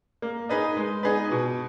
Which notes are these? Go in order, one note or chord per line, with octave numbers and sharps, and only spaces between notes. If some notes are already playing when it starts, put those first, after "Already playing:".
A#3
D#4 G#4 B4 D#5
G#3
B3 D#4 G#4 B4
B2